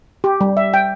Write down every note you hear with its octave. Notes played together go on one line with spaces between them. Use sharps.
G4
G3
E5
G5